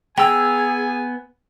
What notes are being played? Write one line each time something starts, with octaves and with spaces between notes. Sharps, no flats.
B3 G#4 G5 G#5 A#5 E6